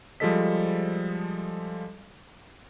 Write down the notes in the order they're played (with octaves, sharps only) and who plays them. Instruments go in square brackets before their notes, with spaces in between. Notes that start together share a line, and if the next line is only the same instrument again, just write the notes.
[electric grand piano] F3 G3 G#3 A4 D#5 B6